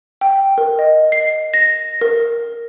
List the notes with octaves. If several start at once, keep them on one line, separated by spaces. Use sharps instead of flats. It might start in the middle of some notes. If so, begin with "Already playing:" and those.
G5
A#4
D#5
C7
A#6
A#4